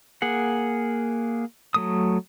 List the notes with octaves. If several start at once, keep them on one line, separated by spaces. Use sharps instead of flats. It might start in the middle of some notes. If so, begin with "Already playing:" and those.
A#3 G#4 F#5
F#3 A3 D#6